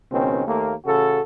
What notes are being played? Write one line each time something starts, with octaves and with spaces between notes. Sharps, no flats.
C#2 B2 D#3 C4 C#4
D#2 A3 A#3
A1 C#3 F#4 A4